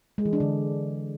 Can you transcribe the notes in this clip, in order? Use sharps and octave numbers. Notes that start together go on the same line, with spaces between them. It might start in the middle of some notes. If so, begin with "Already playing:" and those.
G#3
E3
D4
D3